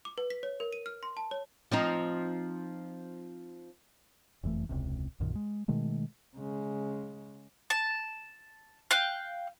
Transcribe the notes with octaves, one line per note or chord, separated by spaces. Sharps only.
D6
B4
B6
C#5
A#4
D#7
F6
C6
A5
C#5
F3 C4 D#4
F#1 F2 E3 A3
E1 C#2 C3
B1 F#2 A#2 D#3
G#3
B2 D#3 G#3 A3
C#3 G#3
A5
F5 G5 F#6